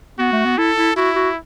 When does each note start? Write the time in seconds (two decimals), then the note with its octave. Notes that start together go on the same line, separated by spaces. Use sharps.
0.19 B3 F#4
0.33 A3
0.45 B3
0.58 E4 A4
0.77 E4
0.97 E4 F#4
1.16 F#4